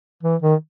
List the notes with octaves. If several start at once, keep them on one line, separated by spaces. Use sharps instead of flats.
E3
D#3